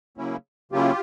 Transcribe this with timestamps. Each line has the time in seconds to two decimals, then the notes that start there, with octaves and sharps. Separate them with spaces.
0.17 C#3 F#3 A#3 C#4 E4
0.72 C#3 F#3 A#3 C#4 E4 F4 G4